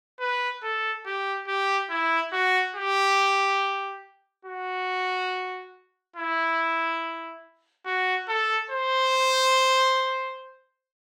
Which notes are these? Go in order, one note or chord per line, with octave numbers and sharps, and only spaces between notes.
B4
A4
G4
G4
E4
F#4
G4
F#4
E4
F#4
A4
C5